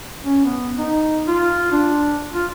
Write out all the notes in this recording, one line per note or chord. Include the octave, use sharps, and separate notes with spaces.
C#4
B3
D#4
F4
D4
F4